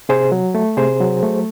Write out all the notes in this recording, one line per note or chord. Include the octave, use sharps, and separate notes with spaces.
C3 G#4 C5
F#3
A3
C3 G#4 C5
F#3
A3